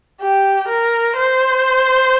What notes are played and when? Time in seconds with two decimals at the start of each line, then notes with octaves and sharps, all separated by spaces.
0.21 G4
0.69 A#4
1.16 C5